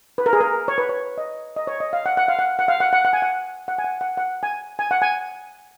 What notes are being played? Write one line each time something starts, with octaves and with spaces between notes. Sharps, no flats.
B4
A#4
G#4
A#4
C#5
B4
C#5
D#5
D#5
C#5
D#5
F5
F#5
F#5
F5
F#5
F#5
F5
F#5
F#5
F#5
G#5
F#5
F#5
G#5
F#5
F#5
F#5
G#5
G#5
F#5
G#5